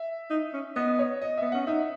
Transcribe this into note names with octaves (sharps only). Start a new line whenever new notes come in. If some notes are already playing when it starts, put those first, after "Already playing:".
Already playing: E5
D#4
C#4
B3 D#5
C#5
D#5
B3 E5
C#4 F#5
D#4 E5